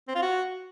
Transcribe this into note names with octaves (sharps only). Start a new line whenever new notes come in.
C4
F4
F#4